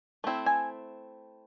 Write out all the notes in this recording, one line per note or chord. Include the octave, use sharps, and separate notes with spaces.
A3 C4 E4
G#5